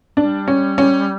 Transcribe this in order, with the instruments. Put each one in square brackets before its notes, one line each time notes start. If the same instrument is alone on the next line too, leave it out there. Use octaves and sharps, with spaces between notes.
[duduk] G3 [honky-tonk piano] D4
[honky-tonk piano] C#4
C#4